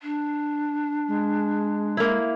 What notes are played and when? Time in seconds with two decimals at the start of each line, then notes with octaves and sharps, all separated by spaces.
0.02 D4
1.08 G#3
1.97 A#3 E4